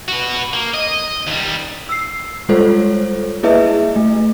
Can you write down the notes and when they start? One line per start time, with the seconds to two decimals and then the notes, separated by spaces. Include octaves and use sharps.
0.08 F#4 B4
0.53 A#3
0.74 D#5
1.27 D#2 G3
1.89 E6 C7
2.49 G3 G#3 F4 A4 C5 C#5
3.43 A#3 E4 G#4 B4 D#5 E5
3.96 A3